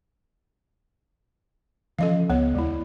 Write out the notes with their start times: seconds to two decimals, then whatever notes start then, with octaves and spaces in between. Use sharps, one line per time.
1.99 E3 F3 C#4 A4 D#5 F5
2.30 C#2 B3 C#5
2.55 D#2 G#3 E4